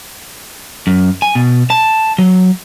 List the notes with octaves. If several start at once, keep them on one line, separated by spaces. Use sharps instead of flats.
F#2
G#5
B2
A5
F#3